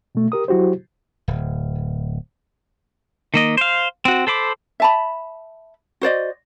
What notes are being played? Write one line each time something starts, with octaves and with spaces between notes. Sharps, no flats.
B2 A3
G4 A#4 D#6
F#3 E4 F#4 G4 C5
D1
D#3 A#3 D#5
C5 F5
C4 F#4
A4 C5 B5 D6
E5 A5 B5
F#4 C5 D5 D#5